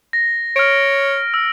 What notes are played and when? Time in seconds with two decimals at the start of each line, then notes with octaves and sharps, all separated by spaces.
0.13 A#6
0.56 C#5 F6 D7
1.34 E6